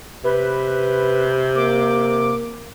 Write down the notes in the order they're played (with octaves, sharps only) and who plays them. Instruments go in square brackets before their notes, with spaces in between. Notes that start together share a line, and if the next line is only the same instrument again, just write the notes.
[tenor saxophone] C3 [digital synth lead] B4
[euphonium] A#3 [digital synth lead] D6